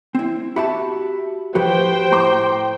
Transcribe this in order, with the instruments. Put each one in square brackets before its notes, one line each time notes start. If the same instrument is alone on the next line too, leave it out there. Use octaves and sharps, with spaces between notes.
[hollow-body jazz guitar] C4 E4
[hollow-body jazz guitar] F#4 G4 A5 [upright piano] E5 B5
[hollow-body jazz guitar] A2 F3 F#4 [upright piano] G4 B4 [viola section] C5 G5
[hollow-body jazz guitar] A2 [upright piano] A#5 C6 D6